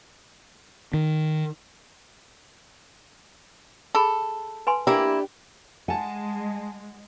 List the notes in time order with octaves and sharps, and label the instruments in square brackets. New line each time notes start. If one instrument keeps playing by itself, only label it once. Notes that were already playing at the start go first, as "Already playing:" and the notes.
[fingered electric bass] D#3
[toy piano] G#4 B5 [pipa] A4
[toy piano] B4 G#5 C6
[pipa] A#3 E4 [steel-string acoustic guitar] D4 G4
[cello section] G#3 [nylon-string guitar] F#5 [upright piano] G#5 A5